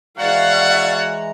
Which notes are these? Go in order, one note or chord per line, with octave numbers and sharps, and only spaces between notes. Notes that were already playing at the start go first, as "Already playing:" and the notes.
E3 G#3 F#4 C#5 D5 F5 F#5 A#5